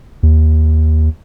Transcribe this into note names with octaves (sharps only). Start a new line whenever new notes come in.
D#2